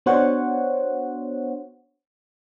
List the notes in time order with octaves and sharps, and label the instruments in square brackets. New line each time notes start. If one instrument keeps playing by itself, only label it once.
[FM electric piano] B3 D4 F#4 C5 C#5 F#5